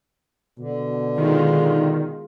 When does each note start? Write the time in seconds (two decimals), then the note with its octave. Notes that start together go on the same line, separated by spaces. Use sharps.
0.59 B2 D3
1.18 D#3 G#3 F4